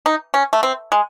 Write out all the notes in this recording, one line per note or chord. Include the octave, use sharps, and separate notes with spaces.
D#4
C#4
A3
C4
G#3